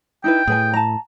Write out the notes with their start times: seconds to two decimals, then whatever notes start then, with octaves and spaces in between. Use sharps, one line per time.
0.24 D#4 E4 B4 G5
0.47 A2 G#4 B4 G#5
0.73 A5 A#5